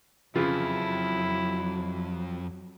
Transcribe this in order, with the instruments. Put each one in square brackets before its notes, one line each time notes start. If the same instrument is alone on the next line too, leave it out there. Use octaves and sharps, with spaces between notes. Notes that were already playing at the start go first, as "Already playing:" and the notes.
[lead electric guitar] F2 [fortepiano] C#3 E3 F4 [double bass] F#3 [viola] E4